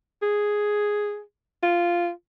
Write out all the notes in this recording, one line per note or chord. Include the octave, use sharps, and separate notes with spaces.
G#4
F4